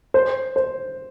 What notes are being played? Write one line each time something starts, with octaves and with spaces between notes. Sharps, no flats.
C5
C5